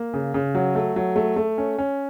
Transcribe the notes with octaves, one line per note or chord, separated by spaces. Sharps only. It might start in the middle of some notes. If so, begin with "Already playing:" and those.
Already playing: A#3
C#3
C#3
F#3
A3
F#3
A3
A3
C#4
C#4